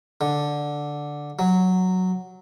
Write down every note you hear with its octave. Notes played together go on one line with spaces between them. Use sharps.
D3
F#3